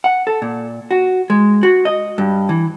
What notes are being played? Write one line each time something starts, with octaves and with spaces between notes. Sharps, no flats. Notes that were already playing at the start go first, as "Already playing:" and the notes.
F#5
A4
A#2
F#4
G#3
F#4
D#5
G2
E3